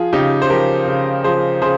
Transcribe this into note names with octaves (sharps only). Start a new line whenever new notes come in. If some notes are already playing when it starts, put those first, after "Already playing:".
Already playing: F3 F4 G#4
C#3 D#4 G4
C5
F3 G4 A#4
C#3
F3 G#4 C5
C#3 G#4 C5